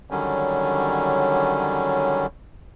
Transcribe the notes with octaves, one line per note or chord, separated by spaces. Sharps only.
D3 D#3 F#3 G3 C#4